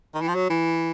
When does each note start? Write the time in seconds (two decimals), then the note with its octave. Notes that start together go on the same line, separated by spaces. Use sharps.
0.14 D#3
0.21 E3
0.28 F3
0.35 F#3
0.49 E3